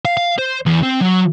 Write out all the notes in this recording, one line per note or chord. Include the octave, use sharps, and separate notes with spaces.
F5
F5
C5
E2
C4
F#3